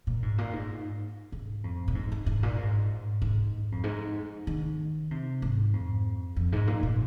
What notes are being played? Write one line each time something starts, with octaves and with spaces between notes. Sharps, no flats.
A#2
G#2
A#2
G#2
G#2
F2
A#2
G#2
G#2
G#2
A#2
G#2
G#2
F2
G#2
D#3
C3
G#2
F2
F2
G#2
A#2
A#2